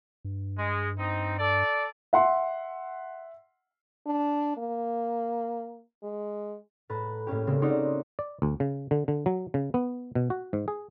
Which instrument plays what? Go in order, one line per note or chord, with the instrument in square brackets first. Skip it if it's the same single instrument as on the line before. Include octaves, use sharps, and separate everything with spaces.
[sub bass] G2
[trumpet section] G#3
C4 D#4
A4 D5
[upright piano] E5 F#5 C6
[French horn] D4
A#3
G#3
[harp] A2 B4 A5 A#5
A2 A#3 C#4 G4
C#3 G3 G#3 A#3 C4
C4 C#4 D#4 F#4 C5 D5
[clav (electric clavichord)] D5
D2
C#3
D3
D3
F#3
C#3
B3
B2
F#4
G#2
G#4